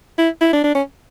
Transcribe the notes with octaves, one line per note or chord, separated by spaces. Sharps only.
E4
E4
D4
D4
C#4